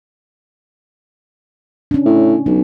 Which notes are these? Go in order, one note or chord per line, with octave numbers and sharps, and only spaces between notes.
C#4 D4
A2
B1 B3